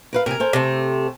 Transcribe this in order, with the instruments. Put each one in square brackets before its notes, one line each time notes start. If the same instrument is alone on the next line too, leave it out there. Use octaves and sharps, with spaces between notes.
[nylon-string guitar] A#4 B4 F5
[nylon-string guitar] C3 G#5 [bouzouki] A#4
[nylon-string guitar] A4 C5 G#5
[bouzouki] C3 A3